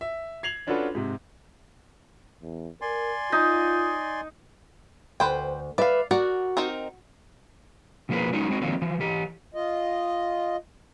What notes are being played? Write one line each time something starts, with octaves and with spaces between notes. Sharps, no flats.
E5
G#6 C7 F7 F#7
C#4 D4 F4 F#4 A4 B4
G#2 C3
E2
A#4 D5 G#5 C6
D#4 F4
D2 B4 C5 G5
B4 D5 E5 F5
F#4 A#4 D5 F#5
C4 D#4 A#4
B2 F3 A#3 E4 G#4 B4
F#3 G#3 C#4 D#4
G#3 C4 F#4
D3 D#3 F3 F#3 A#3 C4
E3 F3
E3 G4
F4 D#5